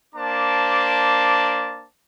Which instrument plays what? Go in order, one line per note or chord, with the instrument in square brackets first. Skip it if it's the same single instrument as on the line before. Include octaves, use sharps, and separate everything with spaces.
[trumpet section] A#3 D4 C5 A5 D6